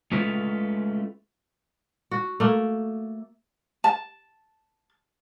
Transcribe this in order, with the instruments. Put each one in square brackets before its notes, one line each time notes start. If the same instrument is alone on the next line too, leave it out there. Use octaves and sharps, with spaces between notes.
[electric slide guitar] G#3 A3 C#4 F4 B4
[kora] F#4
A3 A#3
[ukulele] A5